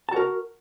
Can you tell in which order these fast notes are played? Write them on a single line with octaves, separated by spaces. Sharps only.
A5 F#4 A#4